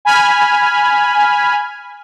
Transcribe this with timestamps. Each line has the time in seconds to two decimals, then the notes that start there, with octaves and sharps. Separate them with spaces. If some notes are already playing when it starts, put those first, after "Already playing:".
0.05 G#5 B5 F6